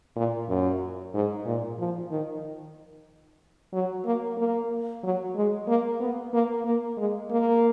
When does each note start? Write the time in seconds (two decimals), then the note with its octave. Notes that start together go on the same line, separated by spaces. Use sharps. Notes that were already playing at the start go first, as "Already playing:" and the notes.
0.16 A#2
0.49 F#2
1.14 G#2
1.46 A#2
1.79 F3
2.11 D#3
3.73 F#3
4.05 A#3
4.38 A#3
5.04 F#3
5.36 G#3
5.68 A#3
6.00 B3
6.33 A#3
6.65 A#3
6.97 G#3
7.31 A#3